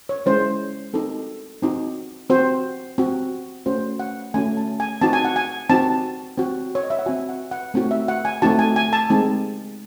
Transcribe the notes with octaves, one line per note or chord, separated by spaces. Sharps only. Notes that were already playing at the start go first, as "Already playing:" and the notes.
C#5
G#3 C#4 E4 C5
C4 D#4 F#4 A4
C4 D#4 F#4
C4 F#4 C5
C4 F#4
A3 C#4 F#4 C5
F#5
A3 C#4 F#4 G#5
A5
G#5
C4 D#4 F#4 A5
G#5
F#5
G#5
C4 D#4 F#4 A5
C4 F#4
C#5
D#5
E5
F#5
C4 F#4 G#5
F#5
F#5
A3 C4 D#4 F#4
E5
F#5
G#5
A3 C4 D#4 F#4 A5
G#5
G#5
A5
G#3 C4 D#4